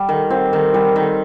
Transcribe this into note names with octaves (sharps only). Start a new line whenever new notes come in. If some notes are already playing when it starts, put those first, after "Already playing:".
Already playing: G3
D#3
C4
D#3
G3
D#3